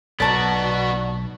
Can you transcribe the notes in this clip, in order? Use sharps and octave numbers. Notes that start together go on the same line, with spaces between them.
B1 G#2 B3 F#4 D5 A5 A#5